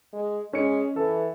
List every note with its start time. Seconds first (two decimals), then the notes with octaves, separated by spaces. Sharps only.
0.13 G#3
0.53 G#3 C#4 C#7
0.96 E3 A4